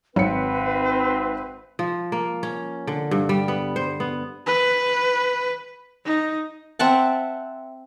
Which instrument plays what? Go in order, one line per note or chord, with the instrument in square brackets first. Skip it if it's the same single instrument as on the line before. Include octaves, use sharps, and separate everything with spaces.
[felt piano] G#1 C#7 [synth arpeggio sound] F#3 [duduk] C4 [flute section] B4
[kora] F3
A#3
C#4
D3
G2
G3
B3
C5
B3
[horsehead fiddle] B4
D#4
[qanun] C4 E5 F#5 A5